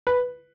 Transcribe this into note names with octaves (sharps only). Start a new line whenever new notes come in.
B4